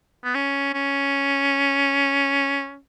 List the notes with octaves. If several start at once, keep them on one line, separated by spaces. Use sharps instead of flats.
B3
C#4
C#4